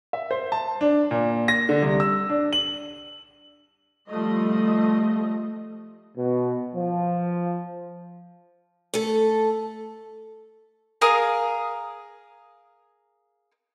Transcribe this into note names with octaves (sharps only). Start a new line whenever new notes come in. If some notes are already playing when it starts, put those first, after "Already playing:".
E5
C5
A5
D4
A#2
A#6
D3
C2
E6
D4
F#7
F3 G3 A3 D#5
B2
F3
A3 A4
G#4 A#4 F5 D#6